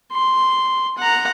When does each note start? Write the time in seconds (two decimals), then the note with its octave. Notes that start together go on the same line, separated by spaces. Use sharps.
0.12 C6
0.98 F#5 A#5